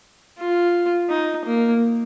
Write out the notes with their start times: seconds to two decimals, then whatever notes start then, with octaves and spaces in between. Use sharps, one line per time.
0.38 F4
1.09 D#4
1.45 A#3